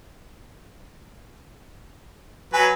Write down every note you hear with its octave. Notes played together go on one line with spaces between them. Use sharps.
F#3 B4 G#5